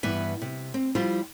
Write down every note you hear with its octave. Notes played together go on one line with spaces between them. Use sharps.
G2 E3 B3 B4 E5
C3
C4
F3 G3 E4 F4 C5